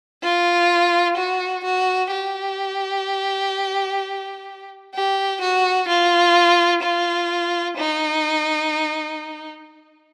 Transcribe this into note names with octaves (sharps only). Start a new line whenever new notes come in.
F4
F#4
F#4
G4
G4
F#4
F4
F4
D#4